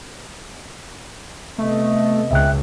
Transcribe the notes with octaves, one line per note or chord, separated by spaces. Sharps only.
C3 A3 B3 D#5
C#2 E5 G5 F#6